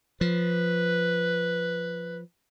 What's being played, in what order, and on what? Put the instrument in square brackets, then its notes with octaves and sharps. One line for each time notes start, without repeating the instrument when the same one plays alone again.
[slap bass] F3 [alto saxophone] B4